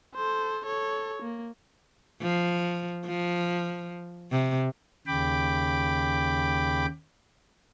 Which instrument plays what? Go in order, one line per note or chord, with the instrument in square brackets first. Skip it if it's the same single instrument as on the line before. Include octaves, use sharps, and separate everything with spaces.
[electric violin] A4 C5
A4 C#5
A#3
[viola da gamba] F3
F3
C3
[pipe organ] D#2 C#3 G5 B5 D6